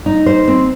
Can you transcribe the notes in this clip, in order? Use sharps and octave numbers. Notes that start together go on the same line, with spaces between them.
D#4
C5
C4